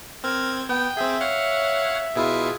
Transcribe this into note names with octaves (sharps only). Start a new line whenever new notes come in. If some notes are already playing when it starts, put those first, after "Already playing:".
C4 A#4 G#6
B3 G5
C4 G#4 E5
C#5 F5 F#5
B2 E4 F4 G#4